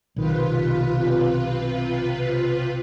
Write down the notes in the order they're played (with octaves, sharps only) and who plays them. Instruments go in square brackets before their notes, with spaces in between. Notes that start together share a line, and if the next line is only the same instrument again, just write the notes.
[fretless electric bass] B1 D#3 [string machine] C3 F4 B4